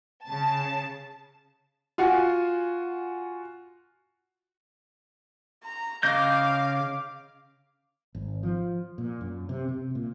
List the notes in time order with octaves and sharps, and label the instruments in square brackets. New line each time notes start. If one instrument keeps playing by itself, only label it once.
[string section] C#3 A5
[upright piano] F4 F#4 F#5 G#5
[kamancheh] A#5
[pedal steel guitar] C#3 D#5 G6 [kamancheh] F5 D6
[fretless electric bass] G#1
F3
A#2
F#2
C3
C3
A#2